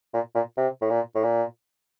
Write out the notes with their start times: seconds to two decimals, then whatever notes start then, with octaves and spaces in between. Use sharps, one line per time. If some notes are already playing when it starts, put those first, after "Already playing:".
0.13 A#2
0.34 A#2
0.57 C3
0.81 A2
0.90 A#2
1.15 A2
1.23 A#2